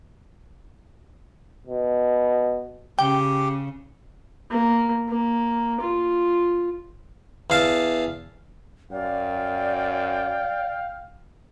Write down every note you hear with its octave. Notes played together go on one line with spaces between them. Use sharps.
B2
C#3 G4 G5
A#3
A#3
F4
E2 F5 A5
F#2 D5 F5 G5